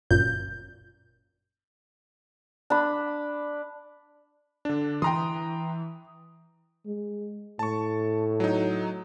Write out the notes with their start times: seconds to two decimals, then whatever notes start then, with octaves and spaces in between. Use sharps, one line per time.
0.11 G1 F#2 A#2 G6
2.70 D4 B5
4.65 D3 D4
5.02 E3 G5 A#5 C6 D#6
6.86 G#3
7.59 A2 A5 C#6
8.40 F#3 D#4